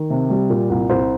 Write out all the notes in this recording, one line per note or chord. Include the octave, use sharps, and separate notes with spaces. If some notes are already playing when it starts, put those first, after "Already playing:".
Already playing: D#3
C3
G3
A#2
C2
C2 C5